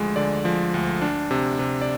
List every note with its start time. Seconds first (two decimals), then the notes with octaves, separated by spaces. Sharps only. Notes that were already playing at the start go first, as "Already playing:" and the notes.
Already playing: D2 F3 G#3
0.16 D3 D5
0.45 F3
0.74 D2
1.02 D4
1.31 C3
1.59 C3
1.82 D5